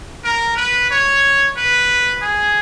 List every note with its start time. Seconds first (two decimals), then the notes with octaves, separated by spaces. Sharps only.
0.24 A#4
0.57 B4
0.91 C#5
1.57 B4
2.21 G#4